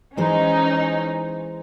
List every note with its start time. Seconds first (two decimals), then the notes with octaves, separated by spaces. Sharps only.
0.17 E3 G#3 C#4 D#4 C5